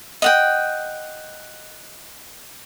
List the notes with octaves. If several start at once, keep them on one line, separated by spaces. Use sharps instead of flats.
D#5 F#5 G5